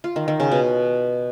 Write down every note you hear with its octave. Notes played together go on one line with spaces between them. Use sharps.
F4
D#3
D#3
C#3
B2